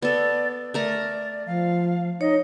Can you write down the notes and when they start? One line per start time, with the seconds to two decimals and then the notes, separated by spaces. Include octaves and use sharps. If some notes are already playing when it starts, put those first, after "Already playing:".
0.02 B3 A4 D5
0.74 A3 A#4 D5 A#5
1.47 F3 F5
2.21 D#4 C#5 D#5